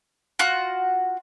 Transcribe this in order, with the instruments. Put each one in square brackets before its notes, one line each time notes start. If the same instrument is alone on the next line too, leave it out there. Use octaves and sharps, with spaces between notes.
[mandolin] F4 F#4 F#5